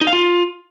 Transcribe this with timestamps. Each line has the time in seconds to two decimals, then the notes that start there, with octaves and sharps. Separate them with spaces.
0.01 D#4
0.07 F5
0.13 F4